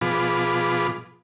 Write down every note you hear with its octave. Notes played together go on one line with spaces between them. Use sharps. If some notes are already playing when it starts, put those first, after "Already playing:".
B2 F3 F4 G#4 B5 D6